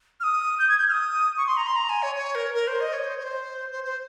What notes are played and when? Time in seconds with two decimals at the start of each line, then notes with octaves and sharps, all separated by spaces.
0.20 F6
0.23 D#6
0.59 G6
0.69 G#6
0.78 G6
0.89 F6
0.92 D#6
1.37 C#6
1.47 C6
1.57 A#5
1.67 C6
1.76 A#5
1.89 G#5
2.03 C#5
2.15 C#5
2.35 A#4
2.55 A#4
2.67 C5
2.80 D#5
2.93 C#5
3.07 C5
3.19 C#5
3.23 C5
3.71 C5
3.84 C5